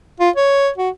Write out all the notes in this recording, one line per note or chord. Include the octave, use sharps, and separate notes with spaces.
F4
C#5
F#4